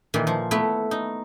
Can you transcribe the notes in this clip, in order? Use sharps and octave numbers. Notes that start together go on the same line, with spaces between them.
A#2 D#3 E3
F3
A3 B3 E4
D#4